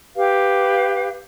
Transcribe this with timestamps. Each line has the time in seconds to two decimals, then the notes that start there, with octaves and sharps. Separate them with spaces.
0.15 G4 B4 F5